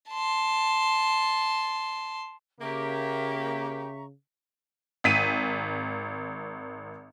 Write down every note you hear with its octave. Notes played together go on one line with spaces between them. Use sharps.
A5 C6
C#3 A#3 G4 E5 A#5 C#6
G#1 B6 D#7